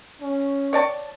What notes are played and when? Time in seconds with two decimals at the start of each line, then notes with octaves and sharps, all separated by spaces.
0.22 C#4
0.73 C#5 D5 A5